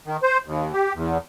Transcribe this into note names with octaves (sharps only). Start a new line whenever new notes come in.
D#3
C5
D#2
G4
E2